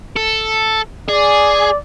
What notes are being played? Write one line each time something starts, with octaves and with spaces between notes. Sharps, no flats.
A4
G#4 D5